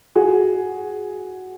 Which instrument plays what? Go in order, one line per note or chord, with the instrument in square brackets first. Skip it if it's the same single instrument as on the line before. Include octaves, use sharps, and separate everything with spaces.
[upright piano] F#4 G#4